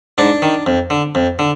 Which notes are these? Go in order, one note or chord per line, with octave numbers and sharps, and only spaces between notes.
G#2 D4
D#3
F2
D3
F2
D3